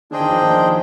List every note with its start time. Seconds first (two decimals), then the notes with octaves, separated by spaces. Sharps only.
0.11 D3 D4 G#4 C5 D#5 G5
0.20 D#3
0.31 F3
0.42 D#3
0.51 F3